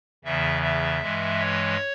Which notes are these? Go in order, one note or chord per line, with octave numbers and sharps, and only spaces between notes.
E2 C#3 E3 E5
E5
G2 E3 G#3
C#5